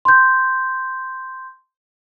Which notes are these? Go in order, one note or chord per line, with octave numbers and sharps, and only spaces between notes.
C6 G6